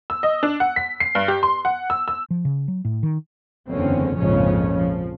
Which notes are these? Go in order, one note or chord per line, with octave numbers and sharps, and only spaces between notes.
E6
D#5
D4
F#5
B6
C7
G2
G4
C6
F#5
E6
E6
F3
C#3
F#3
A2
D#3
F#1 E2 D3 C4 C#4
A#1 F2 G#2 C#3 F3 C#4
F3